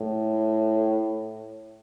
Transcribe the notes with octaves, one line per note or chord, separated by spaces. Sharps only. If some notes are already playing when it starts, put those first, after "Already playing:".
Already playing: A2